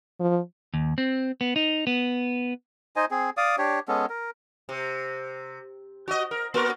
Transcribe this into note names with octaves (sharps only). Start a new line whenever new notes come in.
F3
D#2
C4
B3
D#4
B3
D#4 C5 D#5 G#5
C4 G#4
D5 F5 D#6
D4 G4 C#5
G#3 B3 C#4 A4
A#4
C3
F#4 D#5
A#4
A#3 F#4 A#4